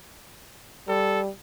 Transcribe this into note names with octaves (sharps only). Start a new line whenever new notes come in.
G3 A4